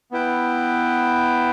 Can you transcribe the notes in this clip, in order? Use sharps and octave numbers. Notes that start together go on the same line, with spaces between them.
B3 E4 B4 G5